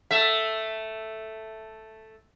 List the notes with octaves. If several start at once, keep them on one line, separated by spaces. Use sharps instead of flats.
A3 E5